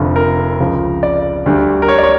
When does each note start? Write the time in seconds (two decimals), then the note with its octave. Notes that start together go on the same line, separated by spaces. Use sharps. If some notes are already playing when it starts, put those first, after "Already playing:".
Already playing: F1 F2 D3 F3
0.16 A#4
0.59 C#2 C#3 F3
1.03 D5
1.46 D2 D3 G3
1.82 A#4
1.89 C#5
1.98 D5
2.03 C#5